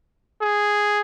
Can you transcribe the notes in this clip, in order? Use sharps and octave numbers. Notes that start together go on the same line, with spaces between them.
G#4